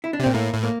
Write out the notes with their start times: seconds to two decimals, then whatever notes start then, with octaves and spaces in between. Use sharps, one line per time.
0.04 E4
0.13 D4
0.20 C3
0.24 A#2 C4
0.34 A2 A#3
0.53 A2
0.63 A#3